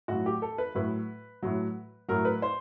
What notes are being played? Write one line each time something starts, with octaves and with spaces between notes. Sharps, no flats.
A2 F#3 F#4
G4
A4
B4
A2 F#3 B4
A2 F#3
A2 F#3 A#4
B4
C5